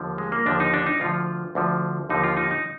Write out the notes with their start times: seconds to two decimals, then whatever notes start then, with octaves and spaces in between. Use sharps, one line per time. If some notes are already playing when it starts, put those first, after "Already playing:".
Already playing: D#2 D3 F3
0.18 G#3
0.32 A#3
0.46 D#2 D3 F3 D4
0.60 D#4
0.74 D4
0.86 D#4
1.00 D2 D3 F3 F4
1.55 D2 D3 F3
2.09 D#2 D3 F3 D#4
2.24 F4
2.37 D#4
2.51 D#4